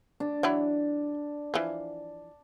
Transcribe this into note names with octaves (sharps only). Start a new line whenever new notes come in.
D4
E3 F#3 E4
E3 F3